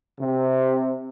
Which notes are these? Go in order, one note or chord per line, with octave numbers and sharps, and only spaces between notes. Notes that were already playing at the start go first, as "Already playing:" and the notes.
C3